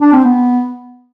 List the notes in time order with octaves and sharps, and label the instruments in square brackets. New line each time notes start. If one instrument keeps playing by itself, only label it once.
[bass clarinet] D4
C4
B3